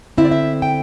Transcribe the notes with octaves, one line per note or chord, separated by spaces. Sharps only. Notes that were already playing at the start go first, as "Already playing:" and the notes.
D3 C4 E4 E5
D5
E5
G5